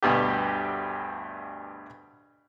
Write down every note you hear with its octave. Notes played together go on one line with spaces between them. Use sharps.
D2 G2 B2 G4